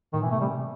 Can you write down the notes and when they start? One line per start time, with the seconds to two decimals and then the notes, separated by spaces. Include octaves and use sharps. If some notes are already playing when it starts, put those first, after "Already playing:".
0.13 A2 D#3
0.22 E3
0.25 B2
0.31 A3
0.37 C3 G3